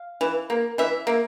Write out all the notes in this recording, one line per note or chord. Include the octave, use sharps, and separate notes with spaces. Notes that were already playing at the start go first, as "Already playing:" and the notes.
Already playing: F5
E3
A#3
E3 E5
A#3